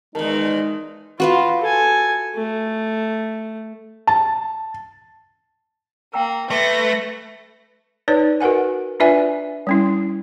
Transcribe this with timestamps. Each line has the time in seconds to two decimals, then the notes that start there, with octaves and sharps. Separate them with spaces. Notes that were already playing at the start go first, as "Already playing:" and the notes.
0.15 E2 D#3 G#3 D#4 A#4 A5
1.20 F4 F#4 B4 F5
1.61 A4 G#5
2.35 A3
4.07 A5
6.14 A#3 G5 A#5 E6
6.50 A3 B4 E5 C6 D6 A#6
8.08 D#4 B4 C#5 D5
8.40 F#4 A#4 B4 F#5 G#5
9.00 D4 F4 B4 D5 E5 G#5
9.67 G3 C#4 E4